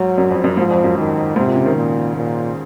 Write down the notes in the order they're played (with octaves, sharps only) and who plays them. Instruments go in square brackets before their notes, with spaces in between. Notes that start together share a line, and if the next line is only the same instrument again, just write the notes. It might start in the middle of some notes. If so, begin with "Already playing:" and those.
Already playing: [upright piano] G#2 [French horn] F#3
[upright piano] F#2
F2
F#2
[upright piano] G#2 [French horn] F3
[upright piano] F2
F#2
[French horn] D#3
[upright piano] G#2 [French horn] C3
[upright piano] A#2
C#3
D#3
[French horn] A#2
A#2